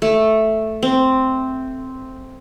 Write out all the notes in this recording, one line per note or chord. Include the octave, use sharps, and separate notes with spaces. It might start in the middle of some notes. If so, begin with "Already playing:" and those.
A3
C4